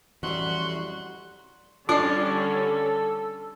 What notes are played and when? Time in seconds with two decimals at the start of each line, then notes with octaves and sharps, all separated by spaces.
0.23 F2 E3 G3 C#4 F#4 C6 F#6
1.89 D3 G3 C#4 D4 F4 A4 D5